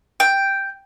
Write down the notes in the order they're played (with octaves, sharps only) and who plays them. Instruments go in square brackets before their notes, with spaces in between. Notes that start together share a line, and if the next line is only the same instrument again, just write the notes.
[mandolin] G5